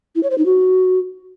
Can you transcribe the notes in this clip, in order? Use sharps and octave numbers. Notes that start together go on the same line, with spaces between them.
E4
C#5
C5
D#4
F#4